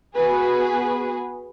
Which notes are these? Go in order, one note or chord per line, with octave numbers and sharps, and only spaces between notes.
B3 F#4 G#4 B4